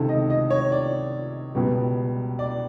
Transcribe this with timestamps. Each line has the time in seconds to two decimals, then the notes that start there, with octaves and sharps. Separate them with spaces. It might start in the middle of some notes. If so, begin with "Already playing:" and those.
Already playing: C#2 C3 D#3 A4
0.09 D#5
0.30 D#5
0.50 C#5
0.72 D5
1.55 C#2 B2 G3 B3
2.39 D5